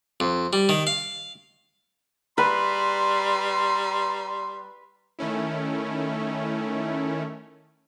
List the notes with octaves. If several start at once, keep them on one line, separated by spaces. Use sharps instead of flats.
F2
G3
D#3
F5
G3 B4 A#5 C6
D#3 A3 C#4 E4